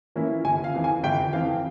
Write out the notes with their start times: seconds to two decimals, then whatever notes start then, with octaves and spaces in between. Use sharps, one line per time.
0.16 E3 A#3 C#4 E4
0.44 G1 G#5
0.64 F5
0.74 F2 E3
0.84 G#5
1.03 G1 G5
1.33 F2 E3 F5